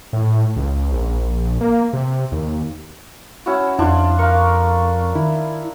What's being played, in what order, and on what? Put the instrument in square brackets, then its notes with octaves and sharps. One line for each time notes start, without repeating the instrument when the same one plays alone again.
[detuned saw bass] A2
C#2
A#1
A#3
C3
D#2
[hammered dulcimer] C#4 E4 F#4
[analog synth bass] F2 [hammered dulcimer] D4 F4 [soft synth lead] E4
[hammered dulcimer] A#4 F5 [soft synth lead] C#6
[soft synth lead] D#3 [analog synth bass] E4